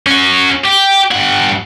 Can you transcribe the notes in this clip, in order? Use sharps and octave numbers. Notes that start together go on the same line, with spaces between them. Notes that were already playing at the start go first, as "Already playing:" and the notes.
C#4 F#4
G4
G2 F#5